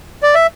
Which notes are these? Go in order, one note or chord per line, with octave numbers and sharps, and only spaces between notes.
D5
E5